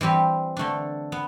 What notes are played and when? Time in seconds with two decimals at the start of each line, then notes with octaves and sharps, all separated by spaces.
0.01 E3 G3 C4 G4
0.57 D3 A3 D4
1.12 B3